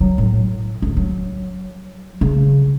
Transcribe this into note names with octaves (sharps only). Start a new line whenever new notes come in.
F#3
A2
D2
F#3
C#3